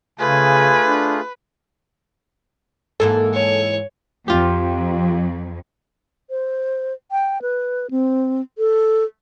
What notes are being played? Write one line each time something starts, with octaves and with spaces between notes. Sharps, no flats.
C#3 A3 F4 G#4 B4 G#5
D4
G#2 E3 A#3 A4
C#5
F2 F4 G4
C5
G5
B4
C4
A4